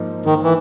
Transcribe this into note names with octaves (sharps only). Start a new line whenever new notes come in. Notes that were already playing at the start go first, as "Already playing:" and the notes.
Already playing: G#2 F3 A#3 D#4
G#2 D#3
E3